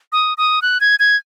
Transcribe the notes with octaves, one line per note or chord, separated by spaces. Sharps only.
D#6
D#6
F#6
G#6
G#6